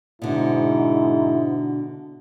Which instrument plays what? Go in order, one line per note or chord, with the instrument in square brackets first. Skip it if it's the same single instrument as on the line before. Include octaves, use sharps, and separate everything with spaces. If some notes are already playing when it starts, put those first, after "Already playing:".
[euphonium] G#2 [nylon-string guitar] B2 D3 [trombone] E4